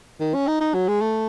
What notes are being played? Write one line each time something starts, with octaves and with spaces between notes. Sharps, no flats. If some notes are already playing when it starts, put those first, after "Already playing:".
D#3
C#4
D#4
D#4
F#3
G#3
A3